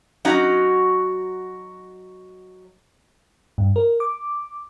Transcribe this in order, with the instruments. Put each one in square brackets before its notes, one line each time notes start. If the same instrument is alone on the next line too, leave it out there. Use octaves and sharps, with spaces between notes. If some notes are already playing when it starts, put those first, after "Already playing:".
[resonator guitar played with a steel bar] F#3 C#4 D#4 F#4
[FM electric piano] G2
A#4
D6